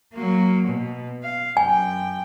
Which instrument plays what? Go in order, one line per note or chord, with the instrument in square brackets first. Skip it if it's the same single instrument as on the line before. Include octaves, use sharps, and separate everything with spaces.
[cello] F#3 A#3
B2
F5
[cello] F#2 G5 [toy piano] G#5